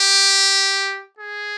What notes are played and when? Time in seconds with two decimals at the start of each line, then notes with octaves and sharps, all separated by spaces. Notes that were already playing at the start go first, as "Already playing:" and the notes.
Already playing: G4
1.19 G#4